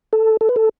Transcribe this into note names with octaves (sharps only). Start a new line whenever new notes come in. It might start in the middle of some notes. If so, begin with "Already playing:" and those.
A4
A4
B4
A4